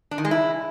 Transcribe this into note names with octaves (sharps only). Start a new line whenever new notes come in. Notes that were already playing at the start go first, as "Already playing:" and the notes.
D4
D#3
G#3
E4